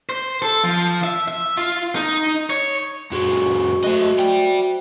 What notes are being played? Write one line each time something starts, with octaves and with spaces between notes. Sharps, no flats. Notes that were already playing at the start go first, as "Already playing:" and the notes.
C5
A4
F3
E5
E5
F4
D#4
C#5
F#2 G#3 F#4 C#6
A3 F#4 C5 D#5 E5
D5 G5